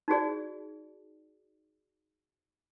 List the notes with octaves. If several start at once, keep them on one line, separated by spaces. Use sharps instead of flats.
D#4 F#4 G#4 D5